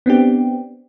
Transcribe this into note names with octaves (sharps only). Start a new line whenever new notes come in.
B3 C4 D4 G4